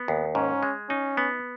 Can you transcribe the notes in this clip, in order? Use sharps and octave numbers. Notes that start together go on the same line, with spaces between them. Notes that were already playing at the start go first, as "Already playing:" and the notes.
Already playing: B3
D#2
G#2 C#4
G#3
C#4 D#4
B3